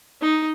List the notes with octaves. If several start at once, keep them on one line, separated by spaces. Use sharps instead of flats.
D#4